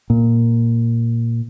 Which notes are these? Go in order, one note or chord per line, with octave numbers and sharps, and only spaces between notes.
A#2